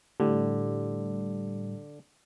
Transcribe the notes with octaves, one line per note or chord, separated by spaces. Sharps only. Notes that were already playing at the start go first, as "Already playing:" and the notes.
A2 D3 G3